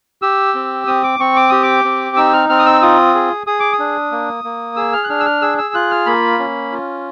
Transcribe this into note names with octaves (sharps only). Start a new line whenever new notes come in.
G4 E6
C4
C4 D#6
D6
C4 C#6
D6
G4 D#6
D6
C4
D#4 E6
F6
C4 F6
D#6
E6
F4 D#6
G#4
G#4 D#6
D6
D#6
D4
A#3
A#3
G#4 E6
F6
F#6
D4 F6
E6
F6
G#4 E6
E6
F4 F#6
F6
A#3 B5
C#4
F4